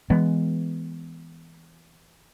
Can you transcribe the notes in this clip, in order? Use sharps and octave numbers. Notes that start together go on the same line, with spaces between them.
E3 G#3 B3